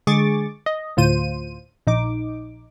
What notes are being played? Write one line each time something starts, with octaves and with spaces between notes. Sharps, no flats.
D3 G#3 G#4 C#6 D6 A6
D#5
D2 A2 F4 C5 D#7
A#1 D#4 D6